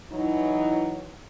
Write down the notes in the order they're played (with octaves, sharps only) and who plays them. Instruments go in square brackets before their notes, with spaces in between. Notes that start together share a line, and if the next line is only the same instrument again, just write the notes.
[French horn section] E3 F#3 D#4 E4